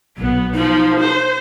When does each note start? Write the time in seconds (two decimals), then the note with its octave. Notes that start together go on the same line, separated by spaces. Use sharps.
0.17 B1 F#3 B3
0.53 F3 D#4
1.00 C5